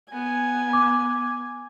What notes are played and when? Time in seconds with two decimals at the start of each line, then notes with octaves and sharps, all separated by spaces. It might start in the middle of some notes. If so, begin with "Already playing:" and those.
0.12 B3 G#5
0.73 D6